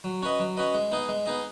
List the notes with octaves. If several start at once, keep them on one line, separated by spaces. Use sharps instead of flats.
F#3
C#4 F#4 B4 D#5
F#3
C#4 F#4 B4 D#5
G#3
B3 D#4 G#4 D#5
G#3
B3 D#4 G#4 D#5